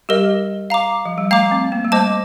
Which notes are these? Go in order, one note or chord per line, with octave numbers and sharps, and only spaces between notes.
G3 G4 A#4 D#5
F5 A#5 D6
F3
G3
A3 F5 A#5 D6
C4
A#3
G3
A3 C5 D#5 A5 D6